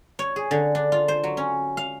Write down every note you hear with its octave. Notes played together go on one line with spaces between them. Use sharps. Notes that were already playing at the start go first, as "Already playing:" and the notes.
C#5
G#4
D3
D4
F4
C5
F#3
C#4
F5